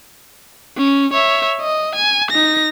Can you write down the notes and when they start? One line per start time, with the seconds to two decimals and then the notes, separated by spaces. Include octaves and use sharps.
0.77 C#4
1.13 C#5 E5
1.62 D#5
1.96 G#5
2.31 D#4 A#6